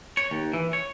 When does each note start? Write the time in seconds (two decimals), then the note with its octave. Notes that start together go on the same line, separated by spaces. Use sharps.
0.17 C#5
0.31 D#2
0.53 E3
0.73 C#5